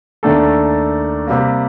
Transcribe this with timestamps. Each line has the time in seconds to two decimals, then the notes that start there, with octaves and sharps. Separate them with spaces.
0.23 D#2 D#3 A3 D4 A4
1.27 C3 G3 A#3